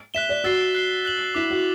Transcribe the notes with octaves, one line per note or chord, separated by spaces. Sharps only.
E5 F#6 B6 E7 G7
D5
F#4 E6 A6 C7 G7
F#6 C7 G7
F#6 B6 F#7
E4 D6 F#6 B6 E7
F#4